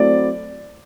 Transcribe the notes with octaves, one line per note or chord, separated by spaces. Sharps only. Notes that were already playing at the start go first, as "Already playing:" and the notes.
Already playing: F#3 A3 C4 E4 D5